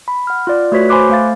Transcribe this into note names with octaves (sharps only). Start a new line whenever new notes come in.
B5
F#5 F6
F4 D5
A3 F#4 B4 C#5 B6
C5 G#5 B5 C6 D6 F#6
A3 F5 A6